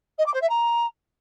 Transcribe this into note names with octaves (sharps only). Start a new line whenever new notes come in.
D#5
D6
C5
E5
A#5